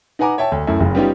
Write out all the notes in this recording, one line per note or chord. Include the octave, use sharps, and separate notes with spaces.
D#4 B4 F#5 G#5 A#5 D6
C#5 E5 G5 A5
D2
F#2 A3 E4
F#1 C#3
G3 B3 C#4 D#4 F4 G4